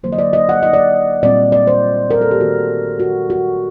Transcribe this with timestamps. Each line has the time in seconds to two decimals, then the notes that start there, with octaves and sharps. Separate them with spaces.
0.04 D3 F#3 A#3 C5
0.12 D#5
0.18 D5
0.33 D#5
0.49 F#5
0.63 D#5
0.73 D5
1.23 A#2 G3 C4 D5
1.52 D5
1.67 C5
2.11 A#4
2.21 A4
2.31 G4
2.40 D#3 A3 C4 F#4
3.00 F#4
3.30 F#4